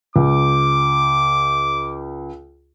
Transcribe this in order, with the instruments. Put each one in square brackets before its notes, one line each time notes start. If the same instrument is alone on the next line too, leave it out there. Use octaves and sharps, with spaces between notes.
[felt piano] C#2 [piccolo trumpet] D6